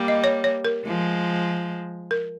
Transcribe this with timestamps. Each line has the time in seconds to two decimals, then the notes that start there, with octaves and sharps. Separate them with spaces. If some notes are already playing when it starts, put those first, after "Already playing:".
Already playing: G3 A#3
0.08 D#5
0.24 C#5
0.44 C#5
0.65 A#4
0.86 F3 G#3
2.11 A#4